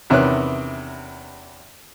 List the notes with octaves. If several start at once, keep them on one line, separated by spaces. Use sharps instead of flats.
E2 C3 D#3 C#4 B4 F#6